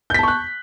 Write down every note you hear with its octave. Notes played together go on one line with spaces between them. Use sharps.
A5 C#6 F#6 G6 B6